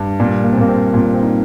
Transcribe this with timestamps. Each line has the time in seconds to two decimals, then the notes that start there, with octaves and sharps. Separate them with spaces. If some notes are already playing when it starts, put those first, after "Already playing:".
Already playing: G2
0.20 A#2 G3
0.44 A#3
0.53 C4
0.57 A#2 A#3
0.69 C4
0.93 A#2 F4
1.14 C4
1.23 D#4